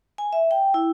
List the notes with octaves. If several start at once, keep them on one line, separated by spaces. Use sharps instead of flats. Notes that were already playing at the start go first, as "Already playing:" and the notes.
G#5
E5
G5
E4